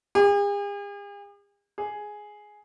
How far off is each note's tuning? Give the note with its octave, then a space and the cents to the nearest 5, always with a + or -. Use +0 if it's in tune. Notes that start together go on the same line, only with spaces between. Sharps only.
G#4 -45
G#4 +5